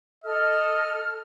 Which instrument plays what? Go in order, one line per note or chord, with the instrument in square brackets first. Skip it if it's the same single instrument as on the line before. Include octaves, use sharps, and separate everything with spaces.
[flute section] A4 F6 [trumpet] D#5